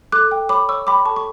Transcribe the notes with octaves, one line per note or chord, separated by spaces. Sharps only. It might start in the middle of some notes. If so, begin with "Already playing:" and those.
A4 D6 F#6
G5
C#5 B5 D6
C#5 C#6 E6
G5 B5 D6
A4 A5 C#6
C#6